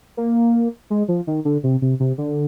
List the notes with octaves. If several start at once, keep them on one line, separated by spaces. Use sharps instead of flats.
A#3
G#3
F3
D#3
D3
C3
C3
C3
D3